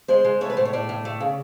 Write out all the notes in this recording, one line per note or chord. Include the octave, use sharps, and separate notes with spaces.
G#3 C5
G#3
A3 C#5
B4
A2 C5
C#5
A2 D5
A2
A3
C#3